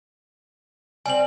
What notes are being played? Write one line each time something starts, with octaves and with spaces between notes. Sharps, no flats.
G3 C4 G#5 F#7